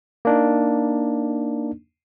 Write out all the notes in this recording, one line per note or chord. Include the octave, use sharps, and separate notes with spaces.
A#3 D4 D#4